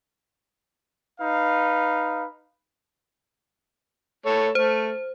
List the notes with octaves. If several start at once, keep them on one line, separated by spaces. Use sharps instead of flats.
D#4 B4 F5
A3 A4 C#5
A3 C5